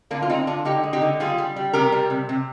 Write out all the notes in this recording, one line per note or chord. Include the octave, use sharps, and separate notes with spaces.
D3 A#3 D4
F4
G#3 C4 D#4
D3 D4 F4
D3 D#4 G4
G#3
D#4 G4
D3
G3 F4 G#4
G3
G3
C3 G4 A#4
G3
C3
C3